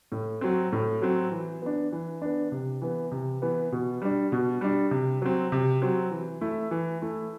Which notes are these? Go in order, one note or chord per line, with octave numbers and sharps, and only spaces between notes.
A2
F#3 C4
A2
F#3 C4
E3
B3 D4
E3
B3 D4
C3
E3 B3
C3
E3 B3
B2
G3 D4
B2
G3 D4
C3
F#3 C4
C3
F#3 C4
E3
A3 E4
E3
A3 E4